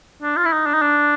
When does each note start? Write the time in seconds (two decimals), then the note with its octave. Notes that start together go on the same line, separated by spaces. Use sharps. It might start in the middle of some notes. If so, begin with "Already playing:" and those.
0.22 D4
0.37 F4
0.45 E4
0.52 D#4
0.66 D4
0.74 D#4
0.82 D4